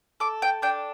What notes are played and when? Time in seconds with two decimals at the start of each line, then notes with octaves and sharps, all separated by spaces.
0.20 A4 D6
0.42 G5
0.62 D4 G5